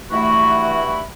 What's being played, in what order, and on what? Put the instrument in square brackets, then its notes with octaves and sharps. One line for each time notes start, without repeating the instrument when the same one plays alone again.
[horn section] G2 E4 B5 [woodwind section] E3 A3 F#4